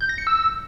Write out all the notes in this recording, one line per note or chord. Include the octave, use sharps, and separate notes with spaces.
G6
A#6
C#7
E6